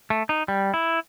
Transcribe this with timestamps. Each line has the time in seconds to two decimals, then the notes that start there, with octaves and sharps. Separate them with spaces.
0.10 A3
0.29 D#4
0.48 G3
0.74 E4